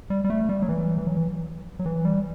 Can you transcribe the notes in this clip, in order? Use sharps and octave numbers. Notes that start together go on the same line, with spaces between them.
G3
G3
A3
G3
F#3
E3
E3
F#3
E3
F#3
E3
G3